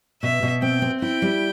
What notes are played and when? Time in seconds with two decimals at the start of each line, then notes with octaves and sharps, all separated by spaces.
0.22 B2 E5
0.43 B2
0.62 C4 G5
0.82 C4
1.02 E4 G5
1.22 G3